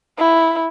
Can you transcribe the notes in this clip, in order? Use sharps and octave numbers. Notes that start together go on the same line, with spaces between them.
E4